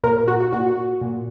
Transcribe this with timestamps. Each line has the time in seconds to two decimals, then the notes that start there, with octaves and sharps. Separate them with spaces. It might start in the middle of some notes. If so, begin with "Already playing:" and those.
0.03 A#2 A#4
0.28 F#4
0.40 F#4
0.52 A#2 F#4
1.01 A#2